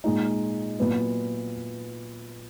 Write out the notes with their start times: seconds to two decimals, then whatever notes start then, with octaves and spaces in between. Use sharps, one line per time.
0.04 A#2 G#3 D#4
0.78 A#2 F#3 B3 E4